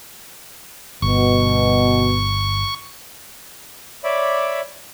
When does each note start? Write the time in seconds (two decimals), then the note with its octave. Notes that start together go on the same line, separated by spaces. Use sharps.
1.02 G1 B2 C#6
4.04 C#5 D5 E5 B5 D6